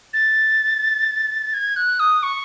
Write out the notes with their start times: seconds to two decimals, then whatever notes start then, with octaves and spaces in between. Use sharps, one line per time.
0.13 A6
1.53 G#6
1.76 F#6
1.99 D#6
2.23 C#6